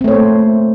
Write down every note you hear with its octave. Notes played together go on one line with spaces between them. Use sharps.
A3 A#3 C4 C5 C#5